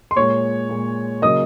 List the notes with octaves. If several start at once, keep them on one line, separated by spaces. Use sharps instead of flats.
C6
A#2 G#3 C#5 C#6
A#2 G#3
C#3 F#3 A#3 D#5 D#6